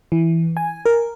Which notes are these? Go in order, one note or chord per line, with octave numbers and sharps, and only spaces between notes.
E3
G#5
A#4